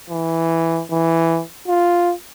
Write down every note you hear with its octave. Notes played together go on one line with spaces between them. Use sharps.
E3
E3
F4